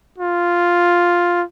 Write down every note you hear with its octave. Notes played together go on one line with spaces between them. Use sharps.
F4